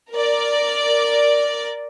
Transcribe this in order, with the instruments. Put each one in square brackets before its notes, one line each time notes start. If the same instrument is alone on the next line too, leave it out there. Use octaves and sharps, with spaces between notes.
[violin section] A#4 D5